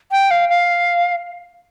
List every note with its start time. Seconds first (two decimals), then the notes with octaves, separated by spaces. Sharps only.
0.11 G5
0.31 F5
0.49 F5